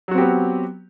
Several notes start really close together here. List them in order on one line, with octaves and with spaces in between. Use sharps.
F#3 F#4 C4 G4 B3